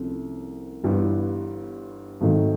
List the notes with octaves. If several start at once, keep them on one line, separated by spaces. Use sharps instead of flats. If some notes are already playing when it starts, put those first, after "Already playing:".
Already playing: C2 C3 F3 A3 C#4
G1 G2 E3 G3 B3
G#1 G#2 D#3 F#3 A3